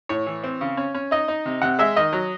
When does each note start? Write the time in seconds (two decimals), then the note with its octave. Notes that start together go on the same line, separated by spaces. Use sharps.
0.09 A2 C#5
0.27 E3
0.44 C4
0.61 C#3
0.77 C#4
0.95 C#4
1.11 D#4 D#5
1.28 D#4
1.46 C3
1.62 C3 F#5
1.79 G#3 E5
1.96 D#3 D#5
2.13 F#3